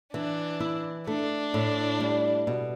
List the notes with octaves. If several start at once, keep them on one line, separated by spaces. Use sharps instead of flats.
E3 D4
E4
A3 D4
A2
G3
B2